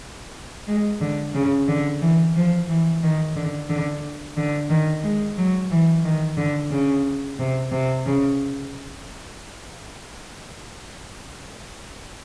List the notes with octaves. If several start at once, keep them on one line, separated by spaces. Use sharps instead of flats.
G#3
D3
C#3
D3
E3
F3
E3
D#3
D3
D3
D3
D#3
G#3
F#3
E3
D#3
D3
C#3
C3
C3
C#3